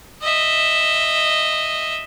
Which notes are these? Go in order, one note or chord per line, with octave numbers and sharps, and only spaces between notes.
D#5 E5